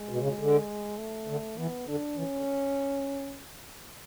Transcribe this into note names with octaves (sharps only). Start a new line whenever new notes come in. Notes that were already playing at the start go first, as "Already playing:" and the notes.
Already playing: G#3
B2
C#3
B2
D3
A3
D3
E3 B3
D3 D4
E3 C#4
D3